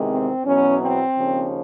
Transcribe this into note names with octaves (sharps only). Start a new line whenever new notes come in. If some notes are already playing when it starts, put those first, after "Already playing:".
Already playing: E2 C3 D#3 G#3
C4
E2 B2 F#3 C#4
C4
D#2 C#3 F3